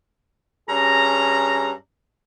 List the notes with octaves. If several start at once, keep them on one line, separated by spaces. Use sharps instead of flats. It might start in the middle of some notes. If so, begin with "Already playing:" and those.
G2 C#4 G#4 A#5